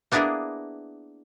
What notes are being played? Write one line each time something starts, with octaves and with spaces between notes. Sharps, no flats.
A#3 B3 D4 E4 G#4 A#4